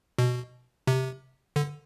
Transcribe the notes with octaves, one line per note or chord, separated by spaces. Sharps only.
B2
C3
D3